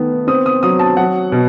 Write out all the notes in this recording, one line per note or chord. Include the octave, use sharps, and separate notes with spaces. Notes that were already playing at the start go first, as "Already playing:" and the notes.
Already playing: D#3 A3 B3
C4 D#6
D#6
F#3 D#6
A5
F#3 F#5
B2